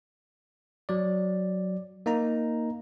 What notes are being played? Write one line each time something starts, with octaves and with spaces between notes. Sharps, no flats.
F#3 D5
A#3 D#4 A#5